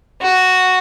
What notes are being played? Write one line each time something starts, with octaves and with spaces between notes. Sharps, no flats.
F#4